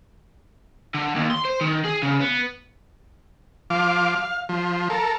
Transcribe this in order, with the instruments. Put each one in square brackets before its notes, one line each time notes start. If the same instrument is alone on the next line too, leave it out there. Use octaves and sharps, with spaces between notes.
[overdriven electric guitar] D3
D#2
C6
C5
D#3
G#4
C#3
B3
[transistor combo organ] F3 F5 D6
F5
F3
A4 A#4